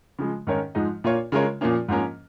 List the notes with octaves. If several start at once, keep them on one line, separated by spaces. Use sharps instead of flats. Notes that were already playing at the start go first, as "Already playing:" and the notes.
C#3 F3 G#3
G#2 D#3 C#4 A#4 C#5
G#2 F3 G#3 D#4
A#2 A#3 F4 C#5
C#3 G#3 F4 A#4 C#5
A#2 F3 A#3 C#4
G#2 F3 A#3 C#4 A#4